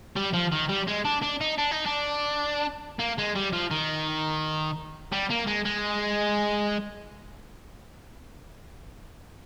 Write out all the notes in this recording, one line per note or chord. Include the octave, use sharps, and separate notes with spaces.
G3
F3
D#3
G3
G#3
D4
D4
D#4
D4
D#4
D4
A#3
G#3
G3
F3
D#3
G3
A#3
G#3
G#3